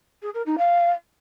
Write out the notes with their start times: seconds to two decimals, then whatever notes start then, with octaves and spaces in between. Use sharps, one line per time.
0.22 G#4
0.34 A#4
0.46 D#4
0.58 F5